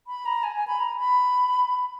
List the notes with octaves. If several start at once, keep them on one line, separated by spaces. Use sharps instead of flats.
B5
A#5
G#5
G#5
B5
A#5
B5